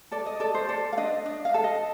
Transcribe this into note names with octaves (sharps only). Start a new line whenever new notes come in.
A4 D5
D#5
A4 D5
C5
A4 D5
F5
D4 D#5
D4 D#5
F5
A4
D#5